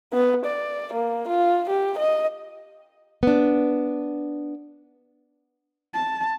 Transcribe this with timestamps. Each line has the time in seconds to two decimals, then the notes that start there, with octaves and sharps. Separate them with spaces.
0.13 B3
0.45 D5
0.93 A#3
1.28 F4
1.69 G4
1.98 D#5
3.23 B3 D4
5.93 A5